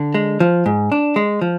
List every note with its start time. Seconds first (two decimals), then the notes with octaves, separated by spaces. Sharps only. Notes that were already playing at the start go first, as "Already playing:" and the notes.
Already playing: D3
0.15 G#3
0.40 F3
0.66 G#2
0.92 D4
1.16 G#3
1.41 F3